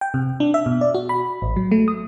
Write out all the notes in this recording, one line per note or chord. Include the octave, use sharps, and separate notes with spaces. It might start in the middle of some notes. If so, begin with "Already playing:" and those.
G5
C3
D4
E5
B2
D5
F#4
B5
A1
F#3
A3
D#6